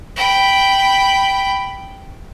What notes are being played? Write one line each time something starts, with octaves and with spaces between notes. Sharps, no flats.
G5 B5